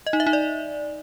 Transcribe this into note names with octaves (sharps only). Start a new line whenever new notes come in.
D#5
D#4
E5
D#4
D5